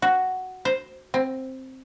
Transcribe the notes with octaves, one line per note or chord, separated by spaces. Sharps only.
F#4
C5
C4